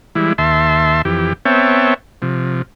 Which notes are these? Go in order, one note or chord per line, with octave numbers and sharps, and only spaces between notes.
E3 G3 G#3 E4
D#2 E5 A5 C6
F2 E3 G4
B3 C4 C#5 E5 G5 A5
C3 F3